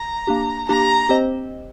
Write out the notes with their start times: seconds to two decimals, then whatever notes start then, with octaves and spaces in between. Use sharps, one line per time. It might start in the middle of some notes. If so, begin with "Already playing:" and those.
Already playing: A#5
0.27 A#3 D4 G4
0.69 A#3 D4 G4 A#5
1.09 C4 G4 C5 D#5